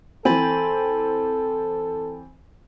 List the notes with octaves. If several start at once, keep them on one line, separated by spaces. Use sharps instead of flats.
E3 C4 A4 G#5 B5 A6